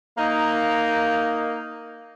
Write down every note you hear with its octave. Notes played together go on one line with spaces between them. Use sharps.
A#3 D#4